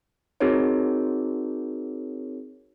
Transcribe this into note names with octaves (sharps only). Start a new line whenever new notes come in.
C4 D#4 F#4 G#4 A#4 C#5